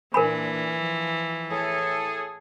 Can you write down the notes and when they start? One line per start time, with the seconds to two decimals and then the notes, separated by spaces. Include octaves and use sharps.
0.14 A#2 E3 D4 A#4 G#5 B5
0.75 F3
1.50 A2 G#4 A4